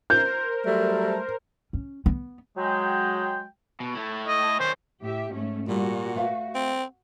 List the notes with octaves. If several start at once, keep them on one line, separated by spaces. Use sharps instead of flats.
A#4 C5 G6
F#3 G3 A3
C#4
B3
F#3 G#3 G5
B2
A3 E4
D#5
D#3 C#4 C5
A2 G4 E5
G#2 A3 C#4
A#2 G3 F#4
A3 B4 F5
C4